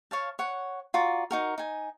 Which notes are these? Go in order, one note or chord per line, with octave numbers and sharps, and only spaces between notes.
C#5 F5 A5
C#5 F#5
F4 F#4 D5 A#5
D#4 F#4 A#4
D#4 G#5